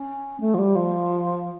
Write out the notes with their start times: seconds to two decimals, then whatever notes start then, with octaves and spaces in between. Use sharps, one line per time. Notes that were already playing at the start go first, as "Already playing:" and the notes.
Already playing: C#4
0.40 A3
0.54 F3
0.58 G3
0.75 F3